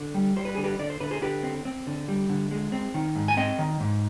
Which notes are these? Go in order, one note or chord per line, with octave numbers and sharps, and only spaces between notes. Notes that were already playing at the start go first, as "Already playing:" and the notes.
Already playing: D3
G3
G3 C5
B4
D3 G#4
G4 B4
D3 D5
C5
D3 B4
G#4 C5
D3 G4 B4
C4
C4
D3
G3
D3
G#3
C4
D#3
G#2
G#5
C4 D#5 G5
D#3
G#2